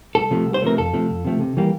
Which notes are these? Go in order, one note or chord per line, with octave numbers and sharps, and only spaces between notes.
C2 A4
C3 F3 A3
C2
C5
C3 F3 A3 A#4
F2 A4
C3 F3 A3
F2
C3 F3 A3
C3
E3 G3 A#3